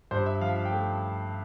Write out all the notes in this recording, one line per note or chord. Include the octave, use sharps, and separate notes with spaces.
G2 C5
E5
F3 F5
F5
G5
A3